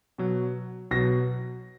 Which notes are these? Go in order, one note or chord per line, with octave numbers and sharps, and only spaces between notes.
B2 F#3
B2 F#3 A#6